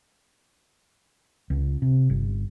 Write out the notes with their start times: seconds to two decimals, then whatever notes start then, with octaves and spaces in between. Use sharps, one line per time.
1.50 C#2
1.82 C3
2.10 G1